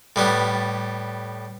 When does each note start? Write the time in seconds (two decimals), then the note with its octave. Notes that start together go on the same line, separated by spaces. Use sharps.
0.16 A2 G3 B3